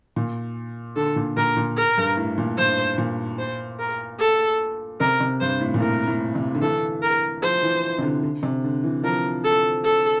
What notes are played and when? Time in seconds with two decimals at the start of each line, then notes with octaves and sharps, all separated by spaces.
0.16 A#2
0.96 D3 A4
1.16 A#2
1.37 A#2 A#4
1.57 A#2
1.77 A#4
1.98 G2
2.17 A2
2.38 A#2
2.58 G2 C5
2.98 A#2
3.39 C5
3.79 A#4
4.20 A4
5.00 C3 A#4
5.20 C3
5.40 G2 C5
5.60 A2
5.74 A#2
5.80 A2 A#4
6.07 A2
6.35 C3
6.55 D3
6.61 E3 A4
7.02 A#4
7.42 F3 C5
7.63 E3
7.99 C3
8.02 D3
8.23 D3
8.43 C3
8.64 D3
8.84 E3
9.03 F3 A#4
9.45 A4
9.85 A4